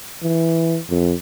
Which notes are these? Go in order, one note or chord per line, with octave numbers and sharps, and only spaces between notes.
E3
F2